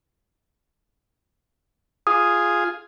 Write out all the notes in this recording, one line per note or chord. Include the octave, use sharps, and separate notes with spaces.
F4 G#4 D#6